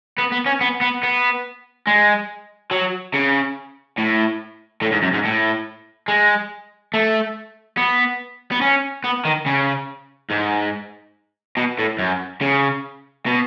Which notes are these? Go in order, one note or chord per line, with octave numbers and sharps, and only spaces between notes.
B3
B3
C#4
B3
B3
B3
G#3
F#3
C#3
A2
A2
G#2
F#2
G#2
A2
G#3
A3
B3
B3
C#4
B3
D#3
C#3
G#2
B2
A2
F#2
C#3
B2